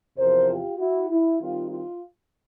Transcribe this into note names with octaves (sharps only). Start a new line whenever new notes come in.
E2 C3 F3 A#4 C5
F4 G4
E4 F#4
E4
D#3 G3 C4 D#4 F4
F4